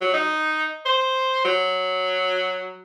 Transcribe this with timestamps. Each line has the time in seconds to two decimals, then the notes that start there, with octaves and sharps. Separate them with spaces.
0.01 F#3
0.13 D#4
0.85 C5
1.44 F#3